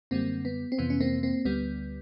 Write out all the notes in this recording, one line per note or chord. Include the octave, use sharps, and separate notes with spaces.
F#2 D3 G3 A#3 C4
B3
C4
F2 C3 E3 B3
C#4
A#3 C4
A#3 C4
D2 D3 G3 B3